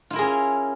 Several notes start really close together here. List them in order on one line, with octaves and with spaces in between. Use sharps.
F4 E4 A#4 G#4 C#4